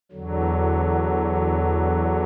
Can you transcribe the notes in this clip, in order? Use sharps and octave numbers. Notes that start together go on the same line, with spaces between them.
E2 D3 F#3